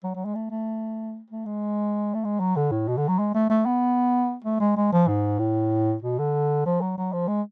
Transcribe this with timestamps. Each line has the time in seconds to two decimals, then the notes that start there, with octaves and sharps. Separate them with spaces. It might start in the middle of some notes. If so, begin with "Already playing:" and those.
0.04 F#3
0.15 F#3
0.25 G#3
0.35 A3
0.51 A3
1.30 A3
1.46 G#3
2.14 A3
2.25 G#3
2.40 F#3
2.56 D3
2.71 A2
2.88 B2
2.97 D3
3.08 F#3
3.19 G#3
3.35 A3
3.50 A3
3.66 B3
4.44 A3
4.60 G#3
4.77 G#3
4.93 F3
5.08 G#2
5.39 A2
6.02 B2
6.19 D3
6.66 F3
6.81 F#3
6.97 F#3
7.13 F3
7.28 G#3